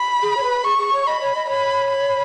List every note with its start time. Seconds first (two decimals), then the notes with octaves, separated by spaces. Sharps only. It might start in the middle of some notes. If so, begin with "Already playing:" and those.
Already playing: B5
0.22 G#4
0.37 C#5
0.43 B4
0.64 G#4 C#6
0.78 G#4
0.93 C#5
1.06 D#5 B5
1.20 C#5
1.35 D#5
1.49 C#5 B5
1.91 B5